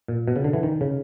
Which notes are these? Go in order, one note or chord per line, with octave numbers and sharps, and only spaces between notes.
A#2
B2
C#3
D3
E3
D#3
C#3